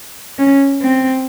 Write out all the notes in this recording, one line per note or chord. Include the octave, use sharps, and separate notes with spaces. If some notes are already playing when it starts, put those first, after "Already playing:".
C#4
C4